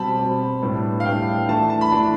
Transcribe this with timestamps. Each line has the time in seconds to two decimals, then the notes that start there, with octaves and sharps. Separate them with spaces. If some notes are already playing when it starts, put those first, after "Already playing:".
Already playing: B2 G3 C4 A5 B5
0.19 B2 G3 C4
0.62 A2 G3 B3 D4
1.00 F5
1.05 A2 G3 B3 D4 G5
1.48 E3 A3 D4 A5
1.70 A5
1.81 B5
1.92 E3 A3 D4